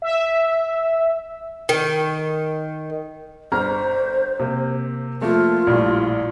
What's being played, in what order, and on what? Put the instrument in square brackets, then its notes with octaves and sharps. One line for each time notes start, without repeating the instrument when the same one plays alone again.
[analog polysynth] E5
[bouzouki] D#3
[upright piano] G1 A#5 F6 [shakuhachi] C5
[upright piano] C3 A#3
[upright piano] F3 A3 A#3 [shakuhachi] F4
[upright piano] A#1 A2 G3